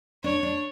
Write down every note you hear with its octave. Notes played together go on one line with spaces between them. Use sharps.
D4 C#5
D4